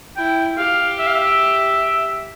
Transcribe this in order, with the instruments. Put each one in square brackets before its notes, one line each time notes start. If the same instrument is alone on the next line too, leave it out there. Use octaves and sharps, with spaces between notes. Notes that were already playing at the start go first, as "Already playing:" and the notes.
[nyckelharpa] E4 [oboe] G5
[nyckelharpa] G4 [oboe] F5
[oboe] E5
F5
E5